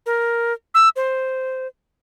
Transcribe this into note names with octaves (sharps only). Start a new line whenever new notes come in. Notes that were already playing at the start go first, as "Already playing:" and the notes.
A#4
E6
C5